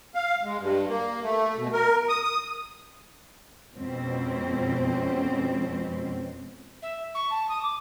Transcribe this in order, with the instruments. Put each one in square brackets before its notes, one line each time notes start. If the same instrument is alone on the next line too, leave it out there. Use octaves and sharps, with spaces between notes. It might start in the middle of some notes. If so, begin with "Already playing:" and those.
[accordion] F5
G#3
G2
A#3
A3
B2
A#4
D#6
D#6
[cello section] F2 B2 G#3 C4 C#4
[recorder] E5
C#6
A5
D#6
D6